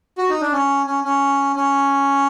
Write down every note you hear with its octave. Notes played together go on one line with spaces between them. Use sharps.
F#4
D#4
D4
C#4
C#4
C#4
C#4